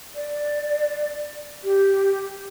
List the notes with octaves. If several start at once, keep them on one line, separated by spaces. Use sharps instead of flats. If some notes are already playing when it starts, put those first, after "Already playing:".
D5
G4